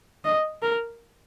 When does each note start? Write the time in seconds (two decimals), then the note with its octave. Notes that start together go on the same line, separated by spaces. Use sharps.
0.25 D#5
0.62 A#4